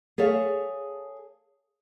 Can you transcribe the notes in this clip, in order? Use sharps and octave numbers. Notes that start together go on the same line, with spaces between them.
G#4 A4 C#5 E5 F5